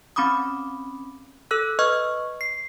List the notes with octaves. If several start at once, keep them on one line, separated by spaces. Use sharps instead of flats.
C4 C#4 B5 D6 D#6
A4 E6 F#6
B4 D#5 C#6 F6
C7